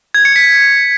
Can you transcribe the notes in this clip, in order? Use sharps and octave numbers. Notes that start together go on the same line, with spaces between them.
G#6
C#7
B6